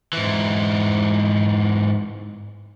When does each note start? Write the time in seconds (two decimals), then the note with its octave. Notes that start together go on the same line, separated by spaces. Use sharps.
0.13 G#2 E3